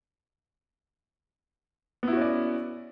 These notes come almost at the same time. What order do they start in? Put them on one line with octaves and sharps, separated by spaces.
B3 E4 F#4 C#4 D5